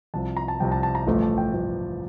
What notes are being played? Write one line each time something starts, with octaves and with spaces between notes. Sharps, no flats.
C2 C3 F3 A5
A#5
A5
C2 C3 F3 G5
A5
A5
A#5
A1 G2 F3 A3
A5
G5
A1 G2 F3 A3